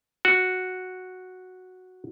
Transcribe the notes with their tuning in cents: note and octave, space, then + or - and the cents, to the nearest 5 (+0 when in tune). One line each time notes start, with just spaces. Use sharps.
F#4 -5